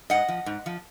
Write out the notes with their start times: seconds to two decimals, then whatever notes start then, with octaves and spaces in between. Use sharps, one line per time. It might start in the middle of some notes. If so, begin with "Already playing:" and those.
0.10 G#2 D#5 F#5
0.28 F3
0.46 G#2
0.66 F3